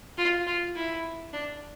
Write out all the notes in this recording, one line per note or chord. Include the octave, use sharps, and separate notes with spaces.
F4
F4
E4
D4